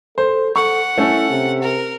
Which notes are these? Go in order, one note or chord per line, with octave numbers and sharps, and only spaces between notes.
A4 C5
A4 F#5 C#6
A3 C#4 E4 A4
C3
A#4